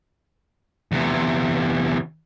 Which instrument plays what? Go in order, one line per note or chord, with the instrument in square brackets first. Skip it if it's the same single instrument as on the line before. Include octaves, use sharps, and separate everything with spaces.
[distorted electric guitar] E2 C3